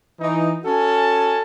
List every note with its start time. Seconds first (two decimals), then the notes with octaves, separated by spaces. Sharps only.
0.20 E3 D#4
0.64 C#4 F#4 A4 G#5 A5